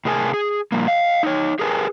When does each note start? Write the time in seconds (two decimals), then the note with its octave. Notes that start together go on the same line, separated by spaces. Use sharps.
0.05 A2 C3 G#4 A#4 C5 G#5
0.34 G#4
0.72 A#2 F3 G3 A#3
0.87 D#5 F5
1.23 D#4 C#5
1.59 G4 G#4 A#4 B4 G#5